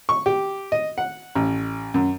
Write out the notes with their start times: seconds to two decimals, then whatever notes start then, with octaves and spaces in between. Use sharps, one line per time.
0.09 C#6
0.26 G4
0.72 D#5
0.98 F#5
1.35 A1
1.94 F#2